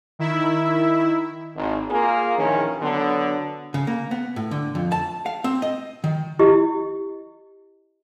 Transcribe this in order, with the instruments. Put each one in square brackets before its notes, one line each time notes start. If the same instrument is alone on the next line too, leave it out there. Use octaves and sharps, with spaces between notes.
[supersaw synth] D#3 E4 E5
[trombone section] G#1
A#3 F4 G#4
A#1 D#3 E3 C#4
D3 F#3 B3
[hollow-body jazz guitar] C#3
A#3
B3
A2
D3
F2
A5
F5
C4
D#5
D#3
[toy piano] E4 G4 D#5